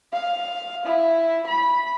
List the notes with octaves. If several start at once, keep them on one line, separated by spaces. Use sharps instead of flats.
F5
E4
B5